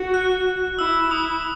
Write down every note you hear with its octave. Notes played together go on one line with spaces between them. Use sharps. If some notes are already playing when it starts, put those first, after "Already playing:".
Already playing: F#4
F#6
E4 E6
E4 D#6